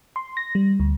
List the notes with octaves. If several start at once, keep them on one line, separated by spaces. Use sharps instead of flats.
C6
A#6
G3
D2